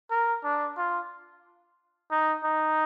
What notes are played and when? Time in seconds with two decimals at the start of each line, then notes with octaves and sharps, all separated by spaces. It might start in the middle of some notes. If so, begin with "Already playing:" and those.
0.11 A#4
0.44 D4
0.77 F4
2.11 D#4
2.44 D#4